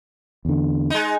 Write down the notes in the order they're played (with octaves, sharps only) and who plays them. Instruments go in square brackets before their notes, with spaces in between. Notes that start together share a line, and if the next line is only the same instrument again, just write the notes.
[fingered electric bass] E2 D3
[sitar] G#3 D#4